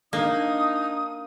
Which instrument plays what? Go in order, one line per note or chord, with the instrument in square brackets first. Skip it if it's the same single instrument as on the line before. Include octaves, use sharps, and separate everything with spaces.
[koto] A#3 [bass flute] D4 [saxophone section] D#4 [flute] D#6